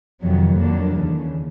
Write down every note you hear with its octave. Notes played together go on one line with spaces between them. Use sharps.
F2 C3 D#3 F#3
F2 D3 F#3 A#3 D4
D#2 C#3 E3